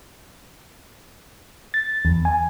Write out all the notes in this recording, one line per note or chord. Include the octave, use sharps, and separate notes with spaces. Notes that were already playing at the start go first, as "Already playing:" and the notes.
A6
E2
G#5